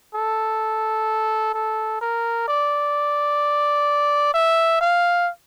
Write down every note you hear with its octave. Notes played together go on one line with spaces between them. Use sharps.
A4
A4
A#4
D5
E5
F5